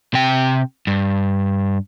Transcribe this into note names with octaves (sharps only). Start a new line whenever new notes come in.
C3 G5
G2